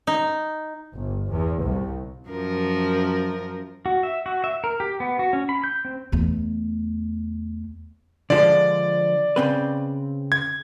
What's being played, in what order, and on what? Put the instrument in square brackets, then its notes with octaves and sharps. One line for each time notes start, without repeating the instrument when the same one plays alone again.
[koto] D#4
[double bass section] G1
E2
C2
[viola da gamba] F#2 F3 A#4
[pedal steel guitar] F#4
E5
F#4
E5
A#4
G4
B3
F#4
C#4
B5
G6
C4
[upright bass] E2 A3
[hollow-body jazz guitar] D3 F3 G#3 [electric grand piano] D5
[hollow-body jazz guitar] C#3 C4 B4
[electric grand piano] G#6